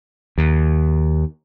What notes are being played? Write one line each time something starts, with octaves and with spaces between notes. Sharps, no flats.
D#2